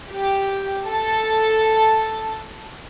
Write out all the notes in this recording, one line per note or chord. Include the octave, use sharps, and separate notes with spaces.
G4
A4